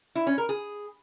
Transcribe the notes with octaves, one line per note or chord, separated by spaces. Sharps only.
E4
C#4
A#4
G#4